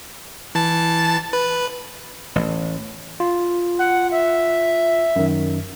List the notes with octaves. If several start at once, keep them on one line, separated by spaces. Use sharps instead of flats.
E3 A5 A6
B4
A1
F4
F#5
E5
F#2 D#3